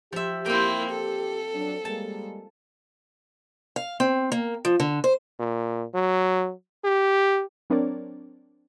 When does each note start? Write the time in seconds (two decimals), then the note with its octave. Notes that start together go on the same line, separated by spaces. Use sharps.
0.13 F3 G4 E5
0.46 A#3 C4 E4 G5
0.90 G4 A4
1.54 F#3 D4
1.85 G3 G#3 A#3 A5
3.76 F5
4.00 C4
4.32 A#3
4.65 F3
4.80 D3
5.04 C5
5.40 A#2
5.94 F#3
6.84 G4
7.70 F#3 C4 D4 A#4 C#5 D5